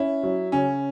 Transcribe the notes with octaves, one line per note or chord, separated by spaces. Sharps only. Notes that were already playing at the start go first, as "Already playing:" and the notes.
Already playing: C#4 E4
F#3
C#3 C#4